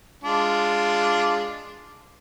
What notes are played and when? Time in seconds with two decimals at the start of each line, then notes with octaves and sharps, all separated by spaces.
0.24 G#3 D4 F4